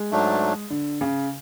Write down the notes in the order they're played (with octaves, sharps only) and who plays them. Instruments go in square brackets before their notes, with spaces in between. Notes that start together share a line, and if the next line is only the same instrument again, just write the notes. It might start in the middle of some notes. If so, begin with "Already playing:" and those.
Already playing: [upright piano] G#3
[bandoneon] G#2 F#3 A3 D4
[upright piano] D3
C#3